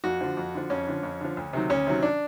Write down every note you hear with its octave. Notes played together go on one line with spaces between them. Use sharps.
F2 F#4
D3 F3
F2
D3 F3
F2 C#4
D3 F3
F2
D3 F3
D2
C3 D#3 F#3
D2 C#4
C3 D#3 F#3
D4